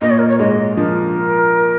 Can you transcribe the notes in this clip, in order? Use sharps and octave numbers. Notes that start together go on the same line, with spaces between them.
A#2 A#3 D#5
C#5
A#4
C#5
G#2 G#3 D#5
F3 A#4